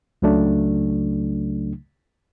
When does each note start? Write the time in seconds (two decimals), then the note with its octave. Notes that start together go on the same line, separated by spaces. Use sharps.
0.22 C#2 C#3 F#3 A3 D4